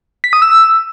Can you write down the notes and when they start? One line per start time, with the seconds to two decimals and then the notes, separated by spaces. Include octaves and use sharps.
0.24 B6
0.33 D#6
0.42 E6